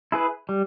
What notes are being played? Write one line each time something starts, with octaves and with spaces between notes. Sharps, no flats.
E4 G#4 B4
G3